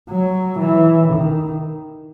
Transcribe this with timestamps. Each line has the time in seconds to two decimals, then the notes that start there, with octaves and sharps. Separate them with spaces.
0.11 F#3
0.59 E3
1.07 D#3